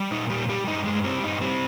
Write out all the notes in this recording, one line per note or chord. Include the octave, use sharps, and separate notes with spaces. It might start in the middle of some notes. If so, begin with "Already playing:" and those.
Already playing: G3
A#2 D#4
G3 G4
G3 G4
G2 D#4
G2 G#3
G3 C4
G2 D#4
G3 C4